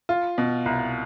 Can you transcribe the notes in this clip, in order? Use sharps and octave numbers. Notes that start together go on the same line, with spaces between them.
F4
B2
C2